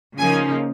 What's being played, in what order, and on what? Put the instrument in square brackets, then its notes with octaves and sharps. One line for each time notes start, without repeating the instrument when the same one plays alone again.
[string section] C#3 F3 A#3 D#4 G#5